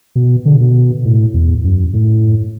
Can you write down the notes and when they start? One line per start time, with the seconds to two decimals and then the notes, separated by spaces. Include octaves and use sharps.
0.15 B2
0.45 D3
0.61 B2
1.05 A2
1.34 E2
1.64 F#2
1.93 A2